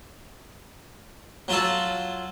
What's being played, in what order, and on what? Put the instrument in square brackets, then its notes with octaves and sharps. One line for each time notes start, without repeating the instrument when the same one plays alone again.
[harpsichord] F#3 F4 A4